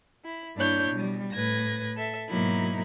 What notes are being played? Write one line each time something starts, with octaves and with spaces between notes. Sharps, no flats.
E4
G2 A#3 D4 E4 C#5 G6
B2 G3
A2 B4 G#6 A#6
A4 E5
G#2 B2 F#3 A#3 D#4 E4